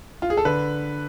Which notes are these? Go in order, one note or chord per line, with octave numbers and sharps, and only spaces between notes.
F4
G#4
A4
D3 B4